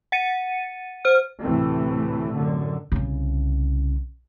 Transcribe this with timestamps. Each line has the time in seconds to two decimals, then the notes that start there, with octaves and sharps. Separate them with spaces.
0.12 F#5 A6 C#7 D#7
1.05 C5 F6
1.43 D2 A2 C3 E3 A3 C4
2.35 F#2 A2 D3
2.92 C2 C#3